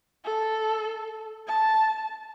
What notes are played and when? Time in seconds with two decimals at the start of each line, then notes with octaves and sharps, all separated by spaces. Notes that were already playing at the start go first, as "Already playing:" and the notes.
0.24 A4
1.47 A5